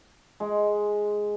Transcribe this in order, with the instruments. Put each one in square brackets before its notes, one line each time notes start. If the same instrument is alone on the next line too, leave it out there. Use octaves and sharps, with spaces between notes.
[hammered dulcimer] G#3